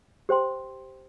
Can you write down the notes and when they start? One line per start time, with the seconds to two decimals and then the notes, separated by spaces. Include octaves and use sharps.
0.29 G4 C5 G5 C6